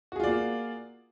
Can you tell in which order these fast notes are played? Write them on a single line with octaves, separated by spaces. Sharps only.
F#4 G#4 F4 D5 A#3